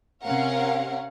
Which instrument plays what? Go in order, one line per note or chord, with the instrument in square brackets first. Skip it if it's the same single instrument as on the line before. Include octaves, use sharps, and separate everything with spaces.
[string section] C3 C#4 A#4 F5 F#5